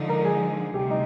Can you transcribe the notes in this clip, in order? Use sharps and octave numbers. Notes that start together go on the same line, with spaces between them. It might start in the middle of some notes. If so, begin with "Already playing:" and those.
Already playing: D3 F3 G#3 D#4
A#4
G#4
D2 C3 G3 G4
D#4